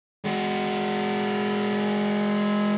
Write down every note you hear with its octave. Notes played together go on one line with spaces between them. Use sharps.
G#3 F#4